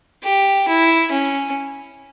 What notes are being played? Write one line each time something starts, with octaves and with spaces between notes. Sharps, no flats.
G4
E4
C#4